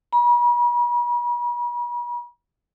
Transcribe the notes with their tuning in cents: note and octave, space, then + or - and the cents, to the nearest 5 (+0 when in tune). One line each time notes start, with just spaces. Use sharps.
B5 -45